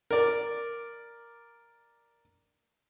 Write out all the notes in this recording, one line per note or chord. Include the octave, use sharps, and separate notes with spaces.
A#4 D5